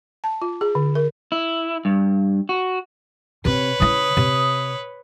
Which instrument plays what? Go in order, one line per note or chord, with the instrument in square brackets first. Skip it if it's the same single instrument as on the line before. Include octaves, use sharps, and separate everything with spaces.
[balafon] A5
F4
G#4
D3
A#4
[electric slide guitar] E4
G2
F#4
[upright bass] C3 C4 [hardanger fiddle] B4 C#5
[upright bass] C#3 E4 [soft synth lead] D#6
[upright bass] C3